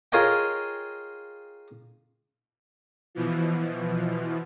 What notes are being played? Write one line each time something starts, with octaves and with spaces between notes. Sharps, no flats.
F4 G#4 A#4 C#5 D#5 G5
B2 E3 F3